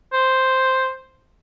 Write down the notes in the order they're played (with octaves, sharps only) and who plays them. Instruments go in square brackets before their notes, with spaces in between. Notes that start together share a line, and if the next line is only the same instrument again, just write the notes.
[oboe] C5